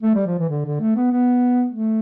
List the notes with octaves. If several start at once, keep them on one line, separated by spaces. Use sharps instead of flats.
A3
G3
F3
E3
D3
D3
A3
B3
B3
A3